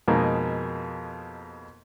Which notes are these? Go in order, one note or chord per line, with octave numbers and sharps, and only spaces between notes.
F2 B2 G#3 A#3 D#4